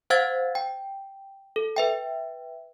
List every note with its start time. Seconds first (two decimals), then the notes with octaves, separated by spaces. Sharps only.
0.10 C5 F5 F#5 E6 G#6 A6
0.55 G5
1.56 A4
1.76 B4 E5 G5